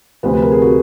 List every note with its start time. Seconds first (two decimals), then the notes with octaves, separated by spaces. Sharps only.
0.23 D2 C3 F3 B4
0.33 B4
0.42 A#4
0.52 G#4
0.62 F#4